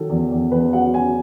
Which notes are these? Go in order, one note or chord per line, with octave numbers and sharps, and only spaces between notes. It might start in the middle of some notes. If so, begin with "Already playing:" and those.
Already playing: D#3 F#3 A4
E2
E2
E2 B4
F#3 F#5
F#3 G#5